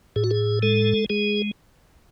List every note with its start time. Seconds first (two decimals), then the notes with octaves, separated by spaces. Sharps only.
0.16 A2 G#4
0.24 F#4
0.31 G#4
0.62 G#3 A4
1.10 G#3 G#4